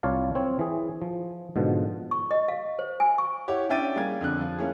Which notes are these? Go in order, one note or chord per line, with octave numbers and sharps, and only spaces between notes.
C2 F4 C#5 D5 F5 A5
C4 C#5
E3 G#4
F3
G#2 B2 D3 F3
C#6
D#5
F5
C5
G#5
C#6
E4 G4 C#5 F#5
C#4 D4 E5 G5 A6 D#7
G3 A#3 G#4 G#6
F2 D3 F#6
F3
A#3 C#4 E4 G#4